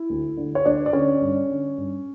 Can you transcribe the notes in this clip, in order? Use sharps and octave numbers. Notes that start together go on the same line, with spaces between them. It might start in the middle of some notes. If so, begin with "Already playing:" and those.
Already playing: E4
D2
D3
C#5
D2 D4 D5
D5
D3 C#4 C#5
G2
D3
G2